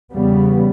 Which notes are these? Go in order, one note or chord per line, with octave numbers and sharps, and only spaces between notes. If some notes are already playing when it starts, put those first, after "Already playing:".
E2 C#3 G3 B3